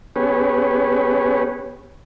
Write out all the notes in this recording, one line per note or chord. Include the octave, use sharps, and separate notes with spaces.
B3 C#4 G4 G#4 B4 C#5